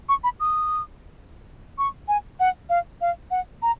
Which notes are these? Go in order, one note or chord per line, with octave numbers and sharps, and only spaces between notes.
C#6
B5
D#6
C#6
G#5
F#5
F5
F5
F#5
A#5